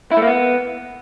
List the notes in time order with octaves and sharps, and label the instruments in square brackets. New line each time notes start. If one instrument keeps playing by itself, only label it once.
[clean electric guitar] E4
A3
A#3
B3